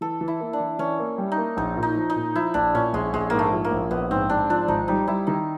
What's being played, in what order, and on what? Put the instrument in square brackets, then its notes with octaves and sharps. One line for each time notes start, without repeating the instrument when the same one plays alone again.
[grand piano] E3 [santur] A4
[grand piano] E3
[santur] E4
[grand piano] A#3
[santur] D4
[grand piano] E3
[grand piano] E3 [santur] C#4
[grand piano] A#3
G3
[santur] D#4
[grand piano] A#3
[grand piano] A#1 [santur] D#4
[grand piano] A#2
[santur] D#4
[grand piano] F3
[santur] D#4
[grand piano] A#2
[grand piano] F3 [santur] E4
[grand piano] A#1 [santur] D4
[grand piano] A#2 [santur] C#4
[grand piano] A#1 [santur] G#3
[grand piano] A#1 [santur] G#3
[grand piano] G#2 [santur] A#3
[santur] A3
[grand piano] F3
[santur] A#3
[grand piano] A#1
[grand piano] A#1 [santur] B3
[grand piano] G#2 [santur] C4
[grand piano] G#2 [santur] D4
[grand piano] F3 [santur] D4
[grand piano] G#1 [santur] D#4
[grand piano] G3 [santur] D#4
[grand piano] G3 [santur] E4
[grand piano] D#3 [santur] D#4